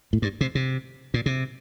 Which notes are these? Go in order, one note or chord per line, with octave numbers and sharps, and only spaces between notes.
A2
G2
C3
C3
A#2
C3